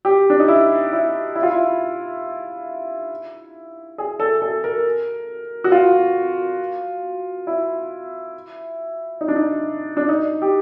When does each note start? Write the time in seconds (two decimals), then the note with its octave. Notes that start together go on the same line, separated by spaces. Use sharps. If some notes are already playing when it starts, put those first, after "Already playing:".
0.05 G4
0.30 D4
0.40 D#4
0.48 E4
0.93 E4
1.35 E4
1.43 F4
1.51 E4
3.98 G#4
4.20 A4
4.42 A4
4.64 A#4
5.64 F#4
5.72 F4
7.47 E4
9.21 D#4
9.28 D4
9.36 D#4
9.97 D4
10.09 D#4
10.42 G4